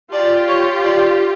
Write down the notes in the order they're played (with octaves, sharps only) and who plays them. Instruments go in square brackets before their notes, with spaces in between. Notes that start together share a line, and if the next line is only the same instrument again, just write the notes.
[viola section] F4 G4 [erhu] D5
[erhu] C#5
D5